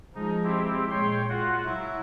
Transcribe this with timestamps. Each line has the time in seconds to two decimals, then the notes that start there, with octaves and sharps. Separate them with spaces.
0.15 F3 G#3 D#4
0.44 C4 E4 G4
0.90 A#2 G#3 C#5 G5 C6
1.29 F4 F#4 F#5
1.65 F#3 E4